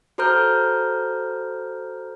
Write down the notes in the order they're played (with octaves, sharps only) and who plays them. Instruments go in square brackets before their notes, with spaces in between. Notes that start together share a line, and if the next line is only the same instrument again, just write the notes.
[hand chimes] F#4 A4 C5 A#5 F6 G6